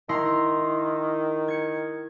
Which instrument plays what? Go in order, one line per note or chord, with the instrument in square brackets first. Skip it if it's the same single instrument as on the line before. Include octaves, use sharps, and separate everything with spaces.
[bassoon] D#3 [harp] E4 A#5 C6
[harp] G#6 C#7